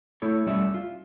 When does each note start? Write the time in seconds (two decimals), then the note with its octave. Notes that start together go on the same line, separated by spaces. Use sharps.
0.22 A3 E4 A4 C#5
0.47 G3 A3 C#4 G4 D5 E5
0.74 F4